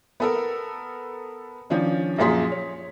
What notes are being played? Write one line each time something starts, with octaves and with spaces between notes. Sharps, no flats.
B3 A4 A#4
D#3 F3 C#4 D4
F#2 A#2 F3 G#4 C6 B6
C#5